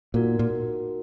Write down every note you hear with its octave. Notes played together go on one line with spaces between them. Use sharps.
A#2 D#4 F#4 A#4
A#2